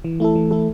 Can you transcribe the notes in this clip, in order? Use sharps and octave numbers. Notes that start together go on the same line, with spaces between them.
E3
A3 E4 A4
E3
A3 E4 A4